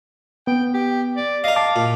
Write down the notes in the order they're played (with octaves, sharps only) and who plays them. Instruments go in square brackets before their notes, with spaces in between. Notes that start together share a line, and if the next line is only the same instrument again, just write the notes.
[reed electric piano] B3 [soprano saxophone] G5
[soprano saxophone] G4
D5
[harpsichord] A#4 D#5 [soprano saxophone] F5
[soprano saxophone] F5 [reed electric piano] A5 D6
[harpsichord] A#2